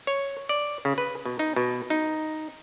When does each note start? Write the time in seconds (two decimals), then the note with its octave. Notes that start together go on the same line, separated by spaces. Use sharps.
0.07 C#5
0.49 D5
0.85 C#3
0.98 B4
1.25 B2
1.39 D#4
1.56 B2
1.90 D#4